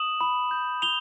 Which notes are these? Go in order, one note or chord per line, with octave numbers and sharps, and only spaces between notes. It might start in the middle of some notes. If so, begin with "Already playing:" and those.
Already playing: D#6 E7 F#7
B5
G6
B5 F7 G7